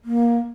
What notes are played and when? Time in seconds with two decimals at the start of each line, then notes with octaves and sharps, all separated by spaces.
0.05 A#3